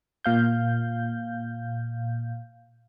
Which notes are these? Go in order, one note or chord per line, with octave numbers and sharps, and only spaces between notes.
A#2 F5 G6